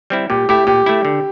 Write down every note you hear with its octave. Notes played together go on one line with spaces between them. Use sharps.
G3 C4 E4
A#2 G4
A3 E4 G4
A#2 G4
A3 E4
D3